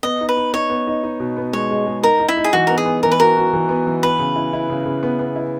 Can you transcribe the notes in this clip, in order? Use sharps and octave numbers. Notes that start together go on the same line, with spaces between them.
B3 D#5
D#4
B4
D#4
D#4 C#5
B3
D#4
D#4
B2
B3
G#3 C#5
G#3
G#3
D#4 A#4
D#4
E4
D#4
G#4
E3 F#4
B3 A#4
G#4
B3
E3 A#4
B4
F#4 A#4
F#4
E3
B3
E3
B3 B4
C#3
E4
E4
C#3
C#3
B3
B3
E4